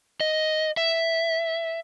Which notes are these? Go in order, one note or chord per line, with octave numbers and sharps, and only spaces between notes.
D#5
E5